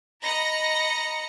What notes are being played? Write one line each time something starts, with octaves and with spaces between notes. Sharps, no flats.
D#5 A#5 B5 A#6 C#7